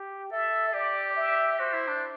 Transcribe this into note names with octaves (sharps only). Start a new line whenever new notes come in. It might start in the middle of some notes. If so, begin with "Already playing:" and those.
Already playing: G4
A4 E5
G4 D5
E5
F#4 C5
E4
D4